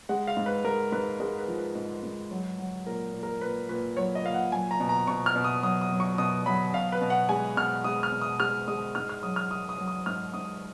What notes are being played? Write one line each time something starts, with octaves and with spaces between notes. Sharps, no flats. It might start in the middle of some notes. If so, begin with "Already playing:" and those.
G#3 F#5
F5
G#2
B4
G#3 A#4
G#2 B4
G#3 A#4
B4
F3
B4
G#2
G#2
F#3
F#3
A#2 A#4
A#2
A#4
A#2 B4
A#2 B4
F#3 C#5
D#5
A#2 F5
F#5
F#3 G#5
A#5
B2
A#5
B2 C#6
F6
B2
D#6
F#3 D#6
D#6
F#3
C#6
B2 D#6
F#3 B5
B2 F5
B4
B2
F#5
G#3 G#5
B2 F6
G#3 D#6
F6
B2
D#6
G#3 F6
G#3 D#6
G#2 F6
F6
F#3 D#6
F6
F#3 D#6
D#6
F#3
D#6
G#2 F6
G#2 D#6